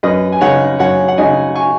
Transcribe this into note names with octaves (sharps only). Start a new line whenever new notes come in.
F#2 B4 D#5
G#5
C#3 G#3 D#4 C#5 F#5
F#2 C#5 F#5
F#5
C#3 G#3 D#4 D#5 G#5
G#5 C#6